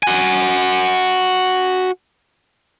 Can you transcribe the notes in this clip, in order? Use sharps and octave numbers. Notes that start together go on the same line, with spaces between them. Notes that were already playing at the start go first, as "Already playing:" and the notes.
F#4 G#5